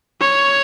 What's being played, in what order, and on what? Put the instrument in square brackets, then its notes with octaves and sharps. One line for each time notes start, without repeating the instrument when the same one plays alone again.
[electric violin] C#5